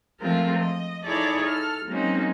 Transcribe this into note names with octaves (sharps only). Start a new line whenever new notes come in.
F3 G#3 A3 C4 F4 A#4
D#5
D#4 E4 G#4 A4 C#5 D5
A4 F6
F#3 G#3 A#3 C4 C#4 D#4